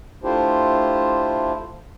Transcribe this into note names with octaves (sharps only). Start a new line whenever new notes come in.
A3 D4 E4 F4 G4 C5